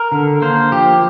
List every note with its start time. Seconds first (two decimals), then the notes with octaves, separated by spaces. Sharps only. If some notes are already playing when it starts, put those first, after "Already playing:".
Already playing: A#4
0.12 D3
0.42 A#3 C5
0.72 F3 G4